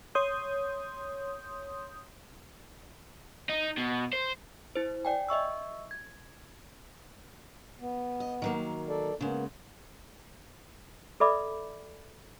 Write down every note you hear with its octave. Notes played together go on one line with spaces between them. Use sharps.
C#5 C6 D#6 G6
D#4
B2
C5
E4 C5
D5 G5 G#5
D#5 E5 C#6 E6
G#6
B3
D#5
D#3 F#3 A#3
A4 D5
C#3 G#3 A#3 B3
A4 B4 D5 E5 B5 D6